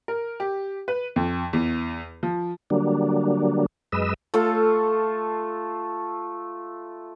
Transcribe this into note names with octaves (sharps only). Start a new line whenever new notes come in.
A#4
G4
B4
F2
E2
F3
D3 F#3 G3 A#3 D4
F#2 G#3 B4 D#5 E6
A3 F4 A4